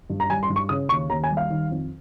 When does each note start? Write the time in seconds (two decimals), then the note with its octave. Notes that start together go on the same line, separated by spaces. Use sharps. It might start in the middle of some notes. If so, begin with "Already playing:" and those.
0.10 G2
0.20 A#5
0.30 G3 G#5
0.43 C6
0.50 G2
0.56 C#6
0.69 C#3 D#6
0.89 D#2 C#6
1.10 D#2 A#5
1.24 G#5
1.30 G3
1.37 F5
1.50 D#3
1.71 F2